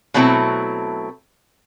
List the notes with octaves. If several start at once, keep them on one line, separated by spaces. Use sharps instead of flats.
B2 F#3 A3 C4 E4 A4